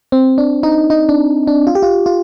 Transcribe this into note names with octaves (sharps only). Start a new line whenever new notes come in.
C4
D4
D#4
D#4
D4
D4
F4
G4
F4
F4